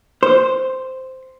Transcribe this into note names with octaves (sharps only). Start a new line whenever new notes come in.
C5